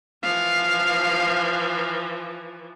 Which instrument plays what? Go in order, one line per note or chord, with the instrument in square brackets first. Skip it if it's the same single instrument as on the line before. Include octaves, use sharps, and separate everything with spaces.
[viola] E3 F3 [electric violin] F5